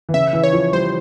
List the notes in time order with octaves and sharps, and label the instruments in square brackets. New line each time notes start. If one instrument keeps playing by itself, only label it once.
[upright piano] E3
[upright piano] C#3 [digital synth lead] E5
[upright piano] E3
[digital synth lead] C#5
[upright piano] F3
[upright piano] G3 [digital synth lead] C5